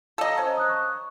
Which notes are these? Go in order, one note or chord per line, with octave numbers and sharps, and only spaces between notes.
A4 D#5 F5 A#5
C#4 C5
D#6 F#6
C#6